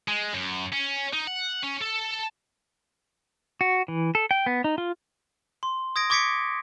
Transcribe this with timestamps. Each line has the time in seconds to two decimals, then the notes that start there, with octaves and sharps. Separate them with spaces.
0.08 G#3
0.34 F#2
0.73 C#4
1.13 D#4
1.27 F#5
1.63 C#4
1.81 A4
3.61 F#4
3.88 E3
4.15 A4
4.31 G5
4.46 B3
4.64 D#4
4.78 F4
5.63 C6
5.96 D#6 G#6 A#6 D7
6.10 C#6 D6 G#6 B6 C#7 D7